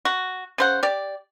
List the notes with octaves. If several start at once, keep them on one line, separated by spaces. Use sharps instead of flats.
F#4
C#3 C5 F#5
G4 D5